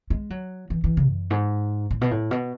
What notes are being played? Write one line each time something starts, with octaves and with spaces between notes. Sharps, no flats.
G#3
F#3
E3
E3
C#3
F#2
G#2
A2
B2
A2
B2